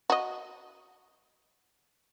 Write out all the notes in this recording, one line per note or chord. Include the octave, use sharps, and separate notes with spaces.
F#4 D#5